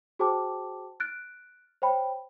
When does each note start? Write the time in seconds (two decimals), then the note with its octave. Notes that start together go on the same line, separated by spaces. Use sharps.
0.19 F#4 G#4 C5 G5 A5 D6
1.00 F6 F#6 A6 D7
1.82 C5 C#5 G5 B5